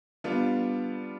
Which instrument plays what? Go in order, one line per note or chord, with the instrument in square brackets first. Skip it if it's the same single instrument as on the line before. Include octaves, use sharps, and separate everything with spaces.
[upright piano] G3 B3 D4 F4